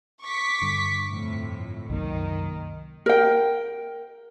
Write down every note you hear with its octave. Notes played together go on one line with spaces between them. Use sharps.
C#6 D6 B6
G2 D3
F2 A2
C2 F#2 D#3 A#3
A#4 G5